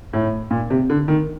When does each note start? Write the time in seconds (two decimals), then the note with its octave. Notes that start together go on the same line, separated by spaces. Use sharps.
0.13 A2
0.51 A#2
0.70 C3
0.90 D3
1.08 D#3